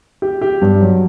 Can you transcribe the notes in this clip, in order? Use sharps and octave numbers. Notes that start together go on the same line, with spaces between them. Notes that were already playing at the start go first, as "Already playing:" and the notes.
G4
G4
G2
F#3